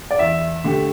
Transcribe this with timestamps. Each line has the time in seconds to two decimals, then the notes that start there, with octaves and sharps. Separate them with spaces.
0.11 D5
0.19 E2 E5
0.64 D3 A3 G4